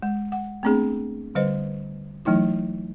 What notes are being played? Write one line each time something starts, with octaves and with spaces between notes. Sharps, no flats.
G#3
F#5
A3 B3 C4 D4 G#4
D3 G3 B4 C5 D#5
E3 F#3 A3 D#4 E4